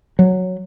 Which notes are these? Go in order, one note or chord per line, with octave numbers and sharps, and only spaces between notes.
F#3